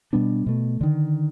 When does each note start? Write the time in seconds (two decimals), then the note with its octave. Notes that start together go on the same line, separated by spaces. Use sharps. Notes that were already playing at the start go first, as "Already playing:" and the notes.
0.13 B2 G3 B3 D4
0.46 B2 A3
0.81 D3 D#3